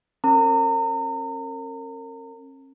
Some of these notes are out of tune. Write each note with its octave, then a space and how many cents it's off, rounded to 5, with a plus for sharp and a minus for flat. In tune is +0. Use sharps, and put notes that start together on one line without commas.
C#4 -45 A#4 -30 A#5 -35